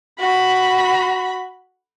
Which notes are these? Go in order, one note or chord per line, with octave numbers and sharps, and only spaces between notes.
F#4 B5